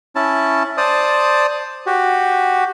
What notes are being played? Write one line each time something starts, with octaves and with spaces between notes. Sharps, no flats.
C#4 E4 A5
C5 D5 A5 D#6
F#4 G4